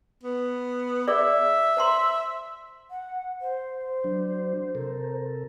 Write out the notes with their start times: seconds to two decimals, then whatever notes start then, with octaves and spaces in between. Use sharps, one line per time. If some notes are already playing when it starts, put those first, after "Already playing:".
0.23 B3
1.08 G#4 D5 E5
1.77 C5 A#5 C6
2.91 F#5
3.41 C5
4.04 F#3 D4
4.75 C3 A4 A#4